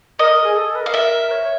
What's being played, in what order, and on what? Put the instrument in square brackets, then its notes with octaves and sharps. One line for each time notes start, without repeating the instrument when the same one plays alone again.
[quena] A#4 [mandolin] D#5
[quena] A#4
G#4
A4
A4
B4
[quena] A#4 [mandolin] F5
[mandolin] E5
[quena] C#5
C#5